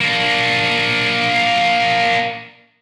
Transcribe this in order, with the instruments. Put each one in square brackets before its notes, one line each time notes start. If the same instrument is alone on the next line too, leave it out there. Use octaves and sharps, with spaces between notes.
[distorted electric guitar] A#3 D4